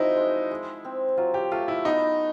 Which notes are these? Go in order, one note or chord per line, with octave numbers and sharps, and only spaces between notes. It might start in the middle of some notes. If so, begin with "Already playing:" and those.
Already playing: F3 C4 D#4 E4 F#4
G#3
G#3
C4
F#3 F4
G4
A3 F4
E4
B3 D#4